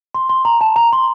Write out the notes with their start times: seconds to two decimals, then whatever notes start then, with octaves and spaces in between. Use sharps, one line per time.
0.15 C6
0.29 C6
0.45 A#5
0.61 A5
0.76 A#5
0.93 C6